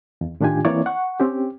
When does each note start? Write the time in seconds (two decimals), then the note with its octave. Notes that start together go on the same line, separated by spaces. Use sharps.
0.21 E2
0.41 A2 D#3 D4 F4 G4 G#5
0.65 E3 A#3 C4 E4 C#5 D5
0.86 F#5 C#6
1.20 C4 C#4 G4